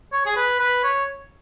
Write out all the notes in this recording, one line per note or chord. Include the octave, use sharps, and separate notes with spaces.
C#5
G#4
B4
B4
C#5